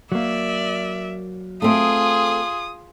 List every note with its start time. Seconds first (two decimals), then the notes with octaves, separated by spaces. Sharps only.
0.12 F#3 A#3 D5 E5
1.62 A3 C4 F4 G#4 D#6